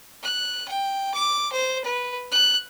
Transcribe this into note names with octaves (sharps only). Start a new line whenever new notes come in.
F#6
G5
D6
C5
B4
F#6